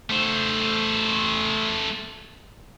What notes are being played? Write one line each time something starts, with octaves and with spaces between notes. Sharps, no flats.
A3 C5